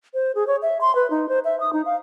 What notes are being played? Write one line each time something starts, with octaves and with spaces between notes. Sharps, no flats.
C5
G#4
C#5
E5
C6
B4
D#4
C5
E5
D#6
D#4
F5